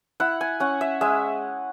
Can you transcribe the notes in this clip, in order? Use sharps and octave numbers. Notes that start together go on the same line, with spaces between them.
E4 F#5
G#5
C#4 F#5
E5
G#3 E5